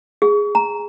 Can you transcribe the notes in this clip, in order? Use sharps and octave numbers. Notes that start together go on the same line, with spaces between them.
G#4
A#5